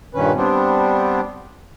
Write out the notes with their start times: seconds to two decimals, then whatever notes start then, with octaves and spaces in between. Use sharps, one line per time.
0.14 G2 A#2 D#3 C#4 B4
0.36 G3 B3 C4 D4